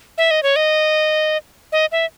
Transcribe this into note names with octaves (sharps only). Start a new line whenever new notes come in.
E5
D#5
C#5
D#5
D#5
E5